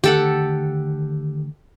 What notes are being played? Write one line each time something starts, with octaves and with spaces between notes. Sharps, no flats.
D3 D#3 A3 G4 A4 F#5